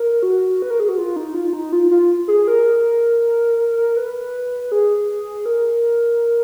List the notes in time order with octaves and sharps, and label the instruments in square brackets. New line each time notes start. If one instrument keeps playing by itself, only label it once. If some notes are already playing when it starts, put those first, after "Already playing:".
Already playing: [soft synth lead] A#4
F#4
B4
A#4
G#4
F#4
F4
D#4
F4
D#4
F4
F4
G#4
A#4
B4
G#4
A#4